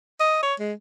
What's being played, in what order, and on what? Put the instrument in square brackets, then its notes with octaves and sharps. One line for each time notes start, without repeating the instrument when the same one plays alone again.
[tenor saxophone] D#5
C#5
G#3